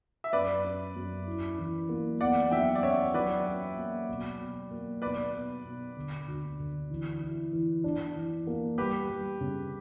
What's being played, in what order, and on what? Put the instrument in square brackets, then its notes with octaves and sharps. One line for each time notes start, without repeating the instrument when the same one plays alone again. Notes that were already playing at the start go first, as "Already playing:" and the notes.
[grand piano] E5
[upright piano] F#2 [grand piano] B4 D5
[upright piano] C#4
F#2
E4
E3
A#3
[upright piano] E2 [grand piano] D5 F#5
[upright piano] F#3 [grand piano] E5 G5
[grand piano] D5
[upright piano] C#4 [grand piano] C#5 E5
[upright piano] F#3 [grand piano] B4 D5
[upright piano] C#4
A#3
B2
B2
A#3
[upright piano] B2 [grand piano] B4 D5
[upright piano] B2
B2
D3
D2
D3
E3
E4
E3
D4
E3
A#3
[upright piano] G3 [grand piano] G4 B4
[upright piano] G3
C#3